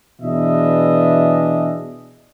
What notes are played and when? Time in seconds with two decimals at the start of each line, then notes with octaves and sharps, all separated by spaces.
0.21 B2 E3 D4 G#4 D#5 E5